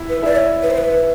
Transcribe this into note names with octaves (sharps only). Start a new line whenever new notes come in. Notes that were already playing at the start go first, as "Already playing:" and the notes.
Already playing: E4 E5
B4
E4 D5 E5
C#5
B4
C5
B4